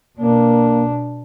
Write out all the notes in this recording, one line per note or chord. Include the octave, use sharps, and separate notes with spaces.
B2 A#3 D4